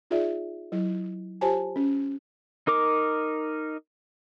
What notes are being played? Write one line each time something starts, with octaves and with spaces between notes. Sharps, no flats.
D#4 F4 G#4 D5 E5
F#3 E4
F4 G4 C5 C#5 G#5 A5
C#4
D#4 A#4 D6